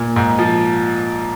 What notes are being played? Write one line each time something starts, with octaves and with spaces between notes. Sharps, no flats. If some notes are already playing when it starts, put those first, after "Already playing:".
Already playing: A#2
G#2
F3